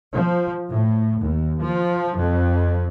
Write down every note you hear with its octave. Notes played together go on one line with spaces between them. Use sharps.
F3
A2
D#2
F3
F2